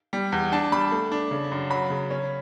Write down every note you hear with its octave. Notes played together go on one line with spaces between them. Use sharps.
G3
E2
D4 A5
G3 B5
A3
D4
C#3
F#2
F#3 B5
C#3
C#4